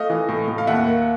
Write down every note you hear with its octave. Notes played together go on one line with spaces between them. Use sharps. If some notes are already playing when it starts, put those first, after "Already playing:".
Already playing: A3 D#5 F5
E3
A2
A2
F5
D#2 E5 F#5
A#3